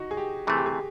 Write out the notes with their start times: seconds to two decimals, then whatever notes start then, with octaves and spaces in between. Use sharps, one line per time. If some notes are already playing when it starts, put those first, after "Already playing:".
Already playing: D#4 F#4
0.11 G#4
0.17 G4
0.47 C3 E3 A3 C4 G#4
0.57 G4
0.66 G#4